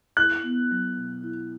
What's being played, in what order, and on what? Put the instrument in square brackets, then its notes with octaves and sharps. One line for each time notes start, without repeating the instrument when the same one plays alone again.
[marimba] E4 [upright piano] F#6
[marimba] B3
F#3
B2
E4